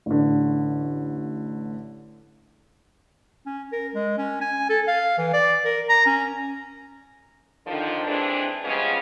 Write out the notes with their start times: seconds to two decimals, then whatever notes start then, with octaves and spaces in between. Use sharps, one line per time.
0.06 A1 D3
3.46 C#4
3.72 A#4
3.95 G#3
4.18 C#4
4.41 G#5
4.70 A4
4.88 F5
5.18 E3
5.33 D5
5.65 A#4
5.89 A#5
6.06 C#4
7.66 D3 D#3 F3
8.06 E3 G#3 C4 D4
8.65 C#3 F3 G3 G#3 B3 C#4